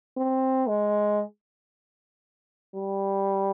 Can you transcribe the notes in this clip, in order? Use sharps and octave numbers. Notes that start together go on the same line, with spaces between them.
C4
G#3
G3